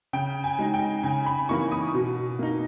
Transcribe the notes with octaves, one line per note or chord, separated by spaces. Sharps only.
C#3 G5
G#5
G#3 D#4
G5
C#3 G#5
B5
E3 A#3 D#4 C#6
D#6
B2
A#3 D#4